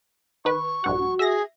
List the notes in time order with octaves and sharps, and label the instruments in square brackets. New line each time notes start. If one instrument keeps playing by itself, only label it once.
[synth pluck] D#3 B4 [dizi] C#6
[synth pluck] A#1 G2 F#5 [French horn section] F#4
[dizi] G#4 [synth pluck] E5 A#6